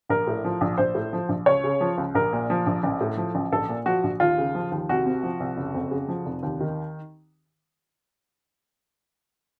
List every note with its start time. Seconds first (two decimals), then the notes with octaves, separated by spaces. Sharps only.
0.09 A#1 A#4
0.27 A2
0.44 F3
0.61 A#1
0.78 A#1 C5
0.95 A2
1.13 F3
1.29 A#1
1.46 C#2 C#5
1.64 C#3
1.81 F3
1.98 C#2
2.15 A#1 A#4
2.33 A#2
2.50 F3
2.67 A#1
2.83 A1
3.01 A2
3.17 F3
3.35 A1
3.52 A#1 A4
3.69 A#2
3.86 F3 F#4
4.03 A#1
4.20 D#2 F4
4.38 C#3
4.55 F3
4.71 D#2
4.89 C2 F#4
5.06 C3
5.23 F3
5.40 C2
5.57 F#1
5.74 F2
5.91 C#3
6.08 F3
6.25 F1
6.43 D#2
6.61 D#3